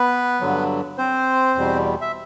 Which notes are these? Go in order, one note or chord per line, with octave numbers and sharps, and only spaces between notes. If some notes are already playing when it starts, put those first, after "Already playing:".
Already playing: B3 B4
G2 D3 F#3
C4 C5
E2 B2 G3
E5